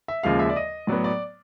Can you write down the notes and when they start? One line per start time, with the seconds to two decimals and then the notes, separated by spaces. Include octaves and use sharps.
0.08 E5
0.23 D#2 C#3 F3 G#3 F5
0.39 E5
0.49 D5
0.56 D#5
0.87 A2 F#3 B3 D5
1.04 D5